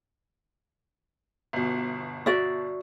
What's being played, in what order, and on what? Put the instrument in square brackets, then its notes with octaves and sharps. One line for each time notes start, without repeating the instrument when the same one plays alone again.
[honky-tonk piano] G1 B2
[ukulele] F#4 D5 E5